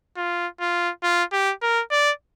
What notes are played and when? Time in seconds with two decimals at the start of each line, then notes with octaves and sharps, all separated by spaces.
0.17 F4
0.60 F4
1.03 F4
1.33 G4
1.62 A#4
1.91 D5